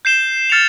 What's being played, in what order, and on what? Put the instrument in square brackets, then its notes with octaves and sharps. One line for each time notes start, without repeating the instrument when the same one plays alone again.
[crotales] G6 C7 E7 G7
F6 A6 C#7 F7